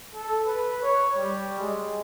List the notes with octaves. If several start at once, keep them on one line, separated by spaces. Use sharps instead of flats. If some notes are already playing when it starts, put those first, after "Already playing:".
A4
B4
C#5
G3
G#3